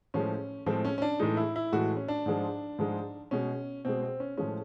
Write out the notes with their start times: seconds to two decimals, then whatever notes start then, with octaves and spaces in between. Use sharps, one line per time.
0.14 A2 F3 G#3 C#4
0.66 A2 F3 G#3 C4
0.85 C#4
0.98 C#4
1.02 D4
1.19 A2 E3 G#3 D#4
1.37 E4
1.56 E4
1.72 A2 E3 G#3 F#4
1.97 C#4
2.08 D4
2.26 G#2 F3 G#3
2.78 G#2 F3 G#3
3.31 B2 G#3 C#4
3.85 B2 G#3 C4
4.02 C4
4.20 C#4
4.37 A2 F3 G#3 C#4